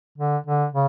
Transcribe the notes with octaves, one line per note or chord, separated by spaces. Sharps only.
D3
D3
C#3